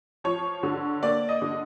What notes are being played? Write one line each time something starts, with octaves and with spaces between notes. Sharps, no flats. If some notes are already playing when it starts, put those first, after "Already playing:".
F3 C#5
D3
A#3 D5
D#5
D3